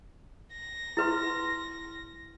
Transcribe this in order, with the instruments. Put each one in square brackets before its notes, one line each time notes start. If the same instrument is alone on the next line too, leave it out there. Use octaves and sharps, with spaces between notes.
[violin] A#6
[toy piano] E4 B4 C6